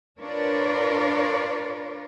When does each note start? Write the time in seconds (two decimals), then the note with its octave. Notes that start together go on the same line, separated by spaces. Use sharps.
0.19 D4 F4 A#4 B4 C#5 D5